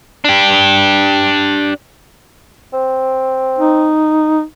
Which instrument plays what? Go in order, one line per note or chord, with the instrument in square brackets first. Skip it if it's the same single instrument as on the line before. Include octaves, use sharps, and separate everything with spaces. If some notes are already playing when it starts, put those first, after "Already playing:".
[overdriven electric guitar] D4 G4
[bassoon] C4
[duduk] D#4